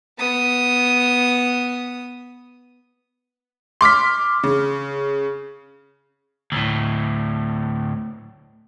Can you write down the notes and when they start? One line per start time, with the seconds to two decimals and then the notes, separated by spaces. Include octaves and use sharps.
0.18 B3 D#6
3.81 C6 D6 F6 B6
4.43 C#3
6.52 D2 A2